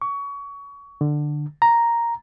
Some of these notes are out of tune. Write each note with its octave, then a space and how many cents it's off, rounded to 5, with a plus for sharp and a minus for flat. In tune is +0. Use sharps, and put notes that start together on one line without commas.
C#6 +25
D3 +15
A#5 +0